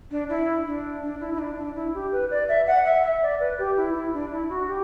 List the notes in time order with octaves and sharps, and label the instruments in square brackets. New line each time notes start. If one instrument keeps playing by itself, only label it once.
[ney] D4
E4
D4
D4
E4
E4
D4
D4
E4
G4
B4
D5
E5
F#5
E5
E5
D5
B4
G4
E4
E4
D4
E4
F#4
G4